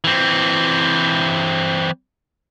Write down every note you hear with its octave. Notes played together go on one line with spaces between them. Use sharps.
E3 C4